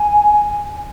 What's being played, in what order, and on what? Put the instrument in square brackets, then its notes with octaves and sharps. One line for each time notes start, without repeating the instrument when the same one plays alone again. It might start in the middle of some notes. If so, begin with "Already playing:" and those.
Already playing: [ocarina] G#5